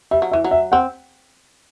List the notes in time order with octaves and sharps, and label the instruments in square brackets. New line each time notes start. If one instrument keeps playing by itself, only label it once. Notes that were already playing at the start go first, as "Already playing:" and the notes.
[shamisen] G3 [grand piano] E5
[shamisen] F#3
[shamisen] E3 [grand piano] E5
[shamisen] F#3
[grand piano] E5
[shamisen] C4 [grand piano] F#5